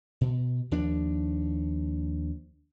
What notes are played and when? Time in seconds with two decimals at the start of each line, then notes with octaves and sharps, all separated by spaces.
0.21 B2
0.71 D#2 F3 D4